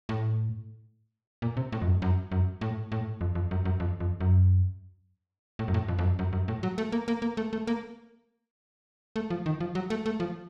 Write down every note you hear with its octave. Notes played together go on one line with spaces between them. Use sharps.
A2
A#2
C3
A2
F2
F#2
F#2
F#2
A2
A2
F2
F2
F#2
F#2
F2
F2
F#2
A2
F#2
A2
F2
F2
F#2
F#2
F#2
A2
F#3
A3
A#3
A#3
A#3
A3
A3
A#3
A3
F3
D#3
F3
F#3
A3
A3
F3